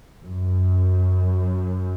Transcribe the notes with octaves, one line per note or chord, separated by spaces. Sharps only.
F#2